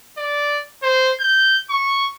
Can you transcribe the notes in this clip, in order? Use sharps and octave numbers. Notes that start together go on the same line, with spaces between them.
D5
C5
G6
C#6